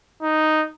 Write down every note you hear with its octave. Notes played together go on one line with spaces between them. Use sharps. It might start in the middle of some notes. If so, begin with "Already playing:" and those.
D#4